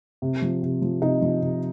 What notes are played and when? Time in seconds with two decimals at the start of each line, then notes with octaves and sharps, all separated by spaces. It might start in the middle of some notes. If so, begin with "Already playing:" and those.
0.22 C3
0.42 F3
0.63 C3
0.82 F3
1.02 C3 D#4
1.22 F3
1.42 C3